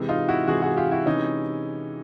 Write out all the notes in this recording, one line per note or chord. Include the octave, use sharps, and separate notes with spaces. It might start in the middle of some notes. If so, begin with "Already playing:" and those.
Already playing: C3 E3 G#3
D#4 F4
E4 F#4
C3 E3 G#3 F#4 G#4
F#4 G#4
F4 G4
E4 F#4
C3 E3 G#3 C#4 D#4